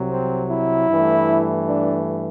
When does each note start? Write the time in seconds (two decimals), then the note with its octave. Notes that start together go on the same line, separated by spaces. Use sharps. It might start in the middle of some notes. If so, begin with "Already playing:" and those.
Already playing: C2 C3 F#3
0.10 C4
0.50 E4
0.89 G2 E3 A3
1.66 D4